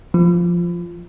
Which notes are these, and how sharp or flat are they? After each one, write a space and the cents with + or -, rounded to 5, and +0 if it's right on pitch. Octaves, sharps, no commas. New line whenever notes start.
F3 -5